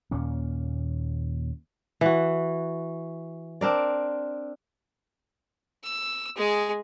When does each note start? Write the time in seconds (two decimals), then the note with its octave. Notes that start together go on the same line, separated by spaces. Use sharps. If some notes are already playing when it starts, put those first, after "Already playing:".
0.11 D#2 A#2 A#3 C#4
2.01 E3 F#4
3.61 C4 D4 A#4 D5
5.84 E6
6.37 G#3 G#4